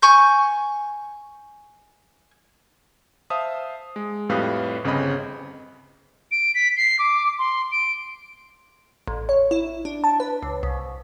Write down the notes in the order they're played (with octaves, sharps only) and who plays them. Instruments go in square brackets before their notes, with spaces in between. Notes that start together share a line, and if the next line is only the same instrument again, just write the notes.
[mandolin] G#5 C#6 G6
[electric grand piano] C5 E5 F5 A5 D#6
G#3
F2 A2 G3 B4 F5 D#6
G1 C#3 C4 G#4 D#5 B5
[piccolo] D7
B6
C7
D6
C6
D7
[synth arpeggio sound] A1
C#5
E4
D4
A5
B4
C#2
C2